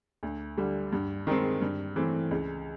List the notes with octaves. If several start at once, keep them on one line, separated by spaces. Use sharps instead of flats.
D2
D3 G3
G2
D#3 G#3 C4
G2
E3 A3 C4
C#2